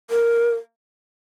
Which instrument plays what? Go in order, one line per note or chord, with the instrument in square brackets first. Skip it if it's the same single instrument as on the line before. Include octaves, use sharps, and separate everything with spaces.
[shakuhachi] A#4